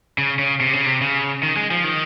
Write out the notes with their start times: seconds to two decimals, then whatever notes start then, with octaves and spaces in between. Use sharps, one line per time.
0.18 C#3
0.39 C#3
0.61 C3
0.73 C#3
0.86 C3
1.01 C#3
1.43 D#3
1.57 G#3
1.71 F3
1.84 D#3